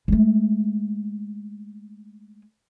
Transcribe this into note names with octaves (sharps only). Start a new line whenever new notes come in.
G#3 A3